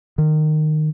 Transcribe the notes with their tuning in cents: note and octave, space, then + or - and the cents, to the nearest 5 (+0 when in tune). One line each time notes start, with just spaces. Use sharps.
D#3 -20